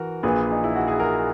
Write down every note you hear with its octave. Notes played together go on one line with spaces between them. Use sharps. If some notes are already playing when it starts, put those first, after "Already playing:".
Already playing: E3 F#4 A#4
A#1 A#2 G#4 B4
D#4
E4
F#4
G#4
F#4 A#4